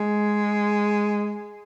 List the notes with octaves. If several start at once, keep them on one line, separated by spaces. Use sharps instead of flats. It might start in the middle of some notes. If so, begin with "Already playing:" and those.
Already playing: G#3